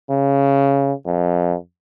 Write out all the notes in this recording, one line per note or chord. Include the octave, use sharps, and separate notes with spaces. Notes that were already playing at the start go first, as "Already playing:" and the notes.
C#3
F2